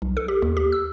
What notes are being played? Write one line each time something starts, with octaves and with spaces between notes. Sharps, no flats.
B1
A4
G4
D#2
G4
E6